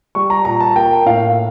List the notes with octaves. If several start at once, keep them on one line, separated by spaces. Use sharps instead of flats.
G3 C#6
A#5
A#2 A#5
A5
A#3 G5
A2 F5